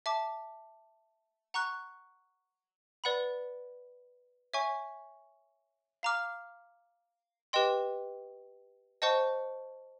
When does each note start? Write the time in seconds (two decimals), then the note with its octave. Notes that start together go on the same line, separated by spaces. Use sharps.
0.06 E5 A5 D6
1.54 F#5 A#5 C#6 F#6
3.04 B4 D5 F#5 B5
4.53 C#5 E5 G#5 C#6
6.03 F5 A#5 D6 F6
7.53 G4 B4 D#5 G5 C6
9.02 C5 D#5 F#5 A5 C#6